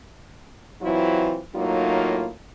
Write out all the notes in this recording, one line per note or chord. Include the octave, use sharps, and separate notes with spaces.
E3 F#3 C4 E4 F4
A2 F#3 A#3 D#4 F4